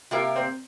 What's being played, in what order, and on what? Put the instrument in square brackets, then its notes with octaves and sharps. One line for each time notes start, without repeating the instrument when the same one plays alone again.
[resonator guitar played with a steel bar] C3 A#3 G4 A#4 [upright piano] F4
[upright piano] C4